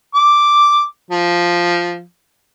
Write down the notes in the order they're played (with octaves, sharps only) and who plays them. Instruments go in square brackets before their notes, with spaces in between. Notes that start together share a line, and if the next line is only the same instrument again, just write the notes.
[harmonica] D6
F3